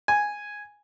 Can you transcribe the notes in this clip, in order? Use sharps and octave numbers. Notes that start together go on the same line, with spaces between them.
G#5